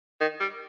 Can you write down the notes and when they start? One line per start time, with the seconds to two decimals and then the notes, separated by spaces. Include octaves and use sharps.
0.21 D#3
0.40 G3